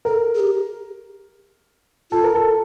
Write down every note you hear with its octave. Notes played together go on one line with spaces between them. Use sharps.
A4 A#4
G#4
G4
F4 A4
A#4
A4